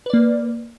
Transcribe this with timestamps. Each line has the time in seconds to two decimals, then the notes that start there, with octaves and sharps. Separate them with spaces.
0.06 B4
0.10 D5
0.13 A#3